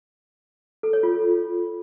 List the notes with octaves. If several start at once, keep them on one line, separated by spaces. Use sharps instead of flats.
A4
C#5
F4